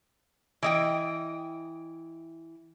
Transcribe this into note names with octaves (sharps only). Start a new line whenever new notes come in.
E3 D#5 G5